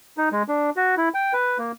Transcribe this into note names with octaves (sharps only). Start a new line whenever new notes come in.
D#4
G#3
D4
F#4
E4
G5
B4
A#3